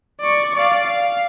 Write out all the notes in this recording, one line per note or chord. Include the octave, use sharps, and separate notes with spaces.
D5 C#6
D5 F5
F5